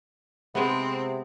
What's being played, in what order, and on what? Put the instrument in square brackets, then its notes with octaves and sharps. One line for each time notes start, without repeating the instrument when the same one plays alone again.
[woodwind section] C3 [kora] G#3 B3 [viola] C4